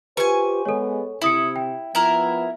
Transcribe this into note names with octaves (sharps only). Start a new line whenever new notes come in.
F4 G4 B4 C5 G#5 C#6
G#3 B3 A4 C#5
C3 E4 E5 D#6 C#7
G5
F3 B3 E4 A#4